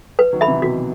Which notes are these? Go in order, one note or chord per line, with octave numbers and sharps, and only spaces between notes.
B4
D#3 F#3
E5 B5
C3 E3
B2 D#3 F#4